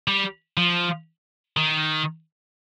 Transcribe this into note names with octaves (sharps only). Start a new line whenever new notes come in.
G3
F3
D#3